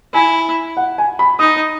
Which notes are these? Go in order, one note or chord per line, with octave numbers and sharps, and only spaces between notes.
E4 G#5
F#5
G#5
B5
D#4 D#6